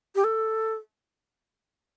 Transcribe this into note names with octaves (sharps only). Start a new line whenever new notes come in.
G4
A4